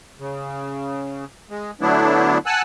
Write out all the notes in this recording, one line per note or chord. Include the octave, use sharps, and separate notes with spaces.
C#3
G#3
D3 F#3 A3 B3 D4 E4
F#5 G#5 A5 E6 F#6